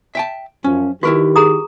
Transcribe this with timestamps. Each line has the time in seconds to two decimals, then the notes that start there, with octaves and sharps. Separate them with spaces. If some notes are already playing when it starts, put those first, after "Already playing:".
0.15 E5 G5 A5
0.64 F#2 F3 C#4
1.03 D#3 E4 F#4 G4 A#4 B4 C#6
1.36 G#4 A#5 D#6